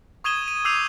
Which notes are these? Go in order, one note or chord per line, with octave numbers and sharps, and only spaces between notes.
C#6 D#6 G#6 D#7 E7 G7
D#7
D6 E6 G6 C7 D#7 F7